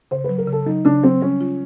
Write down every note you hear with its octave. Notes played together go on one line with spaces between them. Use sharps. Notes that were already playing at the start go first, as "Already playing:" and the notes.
C#3 C5
F#3 B4
A#4
C#3
A4
F#3 D#4
C#3 D4
F#3 C4
G3 C#4
F4